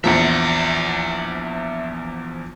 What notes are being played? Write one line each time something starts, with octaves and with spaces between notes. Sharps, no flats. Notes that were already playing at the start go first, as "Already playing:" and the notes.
A#1 E2 F3 E5 F#5